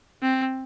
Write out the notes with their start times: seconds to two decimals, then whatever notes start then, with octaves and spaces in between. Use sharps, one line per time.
0.22 C4